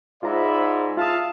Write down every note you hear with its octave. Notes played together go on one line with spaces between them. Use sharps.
G#2 F4 C5 D5 E5 A#5 B5
F4 E5 F5 A5 D#6